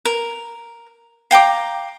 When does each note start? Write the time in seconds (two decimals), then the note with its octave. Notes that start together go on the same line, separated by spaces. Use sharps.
0.05 A#4
1.31 F5 G5 A#5 D6